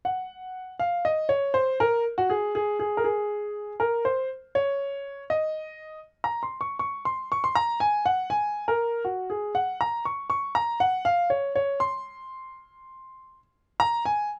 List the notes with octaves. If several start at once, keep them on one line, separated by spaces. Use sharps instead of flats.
F#5
F5
D#5
C#5
C5
A#4
F#4
G#4
G#4
G#4
A#4
G#4
A#4
C5
C#5
D#5
A#5
C6
C#6
C#6
C6
C#6
C6
A#5
G#5
F#5
G#5
A#4
F#4
G#4
F#5
A#5
C#6
C#6
A#5
F#5
F5
C#5
C#5
C6
A#5
G#5